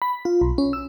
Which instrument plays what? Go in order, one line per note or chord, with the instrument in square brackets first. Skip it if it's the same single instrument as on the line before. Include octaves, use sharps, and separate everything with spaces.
[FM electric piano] B5
F4
B1
C#4
E6